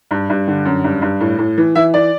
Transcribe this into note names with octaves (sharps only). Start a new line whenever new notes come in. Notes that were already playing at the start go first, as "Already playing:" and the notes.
G2
G2
D3
F#2
G2
G2
A2
A2
E3
E3 E5
E3 D5